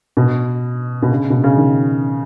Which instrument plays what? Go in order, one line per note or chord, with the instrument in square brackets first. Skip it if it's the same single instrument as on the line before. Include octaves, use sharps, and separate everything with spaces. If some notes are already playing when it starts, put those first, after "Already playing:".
[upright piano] B2
B2
C#3
B2
C#3
D#3